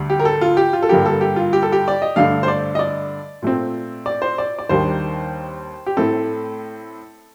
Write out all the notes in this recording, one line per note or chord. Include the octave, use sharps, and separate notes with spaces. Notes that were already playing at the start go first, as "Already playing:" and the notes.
Already playing: D2 D3 G3 D4
G4
A#4
A4
F4
G4
F4
A4
G2 D3 G3 A#3 G4
A4
G4
F4
G4
A4
G4
D5
D#5
G2 D3 A3 D4 F5
C5
D5
D#5
D5
A#2 A3 C4
D5
C5
D5
D5
D#2 D#3 G3 A#3 D4 C5
G4
A2 A3 C4 A4